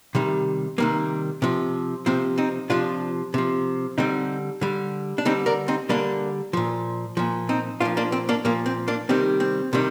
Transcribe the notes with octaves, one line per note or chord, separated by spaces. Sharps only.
C3 D#3 G3
C3 D#3 G3 A#3
C3 F3
C3 F3 C4
C4 D#4
C3 F3 D4 F4
C3 F3
D3 G3 C4 D#4
D3 G3
D4
D3 G3 C4 D#4
A#4 D5
C4 D#4
D3 G3 A#3 D4
A#2 F3
A#2 F3
C4 D#4
A#2 F3 D4 F4
A#3 D4
C4
A#3 D4
A#2 F3 A#3
C4
A#3 D4
C3 D#3 G3 C4
C4
C3 D#3 G3